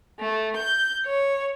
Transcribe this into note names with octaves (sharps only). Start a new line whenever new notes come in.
A3
G6
C#5